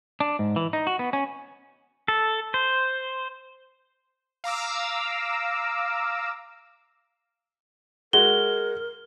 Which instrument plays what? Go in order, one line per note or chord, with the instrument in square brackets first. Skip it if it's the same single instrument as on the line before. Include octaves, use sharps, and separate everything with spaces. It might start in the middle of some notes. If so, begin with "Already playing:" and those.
[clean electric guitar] D4
G#2
E3
D#4
F#4
B3
C#4
[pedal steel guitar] A4
C5
[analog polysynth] F5 A#5 D6 E6
[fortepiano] G#3 F#4 [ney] A#4 [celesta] G7